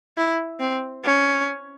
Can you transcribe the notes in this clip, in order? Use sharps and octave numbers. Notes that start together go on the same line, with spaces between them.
E4
C4
C#4